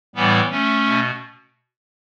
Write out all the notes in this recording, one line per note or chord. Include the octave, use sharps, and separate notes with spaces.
A2 E3 G3 B3
A3 C#4
B2